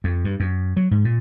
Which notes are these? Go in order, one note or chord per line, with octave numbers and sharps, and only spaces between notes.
F2
G2
F#2
F#3
G#2
A#2